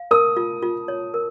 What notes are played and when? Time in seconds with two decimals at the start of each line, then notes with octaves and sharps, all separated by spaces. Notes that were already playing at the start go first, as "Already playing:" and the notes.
Already playing: F5
0.11 A#4 D#6
0.37 F4
0.62 F4
0.88 C#5
1.14 A#4